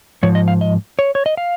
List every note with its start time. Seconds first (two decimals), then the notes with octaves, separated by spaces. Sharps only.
0.23 G#2 F3 C#5
0.35 D#5
0.48 F5
0.61 D#5
0.99 C#5
1.15 C#5
1.26 D#5
1.37 F5